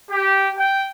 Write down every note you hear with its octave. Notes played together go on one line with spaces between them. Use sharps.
G4
G5